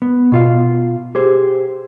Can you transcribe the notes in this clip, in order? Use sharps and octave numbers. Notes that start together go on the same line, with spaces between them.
B3
B2 F4 F5
G4 G#4 C5